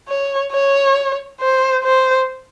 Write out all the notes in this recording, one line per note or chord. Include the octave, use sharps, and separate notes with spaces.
C#5
C#5
C5
C5